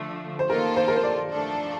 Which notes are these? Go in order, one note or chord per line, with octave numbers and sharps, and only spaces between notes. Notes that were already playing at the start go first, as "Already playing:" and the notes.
Already playing: D3 F3 A3
C5
D#3 A#3 F4 A4 A#4
C5
A#4
C5
D5
F3 A3 D4 A4